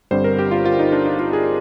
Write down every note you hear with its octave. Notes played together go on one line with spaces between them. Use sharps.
G1 G2 D3 G3 C4 C5
A#4
G4
F4
F4
D#4
D4
D#4
F4
G#4